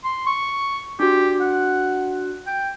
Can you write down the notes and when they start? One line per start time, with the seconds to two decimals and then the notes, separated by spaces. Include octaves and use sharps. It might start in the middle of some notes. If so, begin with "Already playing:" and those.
0.04 C6
0.26 C#6
1.00 D4 F#4 G4
1.41 F#5
2.47 G5